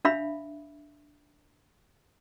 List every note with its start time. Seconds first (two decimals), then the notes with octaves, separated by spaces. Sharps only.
0.05 D4 E5 F5 B5